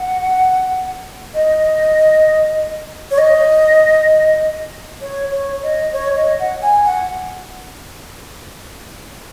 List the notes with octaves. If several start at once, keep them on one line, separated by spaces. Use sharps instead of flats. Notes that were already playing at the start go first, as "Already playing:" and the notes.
Already playing: F#5
D#5
C#5
D#5
C#5
C#5
D#5
C#5
D#5
F#5
G#5
F#5